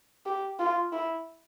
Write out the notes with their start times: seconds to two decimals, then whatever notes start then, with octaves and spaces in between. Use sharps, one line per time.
0.26 G4
0.59 F4
0.92 E4